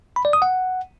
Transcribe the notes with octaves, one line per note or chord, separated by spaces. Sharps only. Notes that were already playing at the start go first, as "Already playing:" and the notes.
B5
D5
D#6
F#5